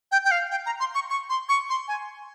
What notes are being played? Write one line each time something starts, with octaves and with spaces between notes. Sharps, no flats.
G5
G5
F5
G5
A#5
C6
C#6
C#6
C6
C#6
C6
G#5